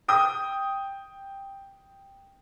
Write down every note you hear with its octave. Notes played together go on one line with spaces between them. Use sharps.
G5 D#6